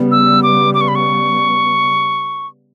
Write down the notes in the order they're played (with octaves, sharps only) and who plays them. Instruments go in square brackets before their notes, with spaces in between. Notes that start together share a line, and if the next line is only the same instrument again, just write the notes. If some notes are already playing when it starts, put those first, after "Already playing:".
Already playing: [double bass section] C#3 G3 B3
[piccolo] E6
D6
D6
C#6
B5
C#6